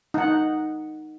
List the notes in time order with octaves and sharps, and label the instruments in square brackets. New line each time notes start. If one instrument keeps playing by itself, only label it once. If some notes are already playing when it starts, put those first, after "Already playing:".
[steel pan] D#4 F#5